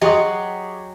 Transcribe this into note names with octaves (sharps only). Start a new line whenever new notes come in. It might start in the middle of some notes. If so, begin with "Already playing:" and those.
F#3 G4 G#4 D#5 C6 C#6 D#6